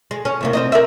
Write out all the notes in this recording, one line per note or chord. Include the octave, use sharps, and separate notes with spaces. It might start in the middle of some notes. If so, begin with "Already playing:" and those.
G#3
C#4
E2 C3 A#3
C4 D#4 D#5
A#4 D5 E5